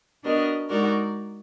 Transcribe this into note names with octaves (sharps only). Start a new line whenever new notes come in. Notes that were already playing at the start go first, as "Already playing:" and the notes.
B3 D4 F#4 A#4 D#5
G#3 D#4 F#4 A#4 D5